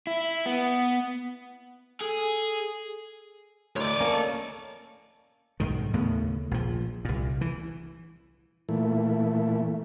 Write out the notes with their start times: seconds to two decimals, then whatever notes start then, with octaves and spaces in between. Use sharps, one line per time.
0.07 E4
0.46 B3
2.01 G#4 A4
3.76 D2 A2 C#5 D5
4.00 A#3 C#4 A4
5.60 B1 G#2 D#3
5.93 D#2 A2 C#3 B3
6.51 A#1 F3
7.05 C2 A#2
7.41 E3
8.69 A#2 E3 A3